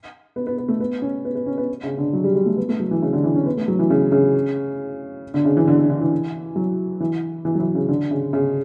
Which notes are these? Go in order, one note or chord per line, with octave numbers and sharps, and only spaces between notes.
B3
B3
B3
A3
B3
C#4
B3
B3
C#4
B3
C#3
D3
F#3
G3
G3
A3
B3
A3
F#3
E3
C#3
D3
E3
C#4
B3
A3
F#3
E3
C#3
C#3
D3
C#3
E3
D3
D3
D3
E3
F#3
E3
E3
F#3
E3
C#3
D3
C#3
C#3